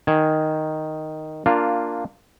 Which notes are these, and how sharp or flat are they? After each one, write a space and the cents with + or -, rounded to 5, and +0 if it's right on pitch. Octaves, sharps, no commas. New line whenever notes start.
D#3 +0 G#5 +0
A#3 -10 D4 +0 F4 +0